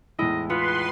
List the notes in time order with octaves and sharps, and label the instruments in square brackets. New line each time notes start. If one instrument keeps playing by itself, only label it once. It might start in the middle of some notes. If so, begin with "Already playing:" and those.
[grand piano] E2 A2 G#3 [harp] E4 [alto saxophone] D#5
[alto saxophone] B3 [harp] F4 [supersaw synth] B4 C6